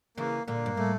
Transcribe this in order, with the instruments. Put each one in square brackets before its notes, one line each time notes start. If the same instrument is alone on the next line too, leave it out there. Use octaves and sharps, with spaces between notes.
[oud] C#3 E3 [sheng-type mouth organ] A#3
[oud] A#2 D3 [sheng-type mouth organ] A#3
[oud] G2
[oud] A2 [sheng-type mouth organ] A3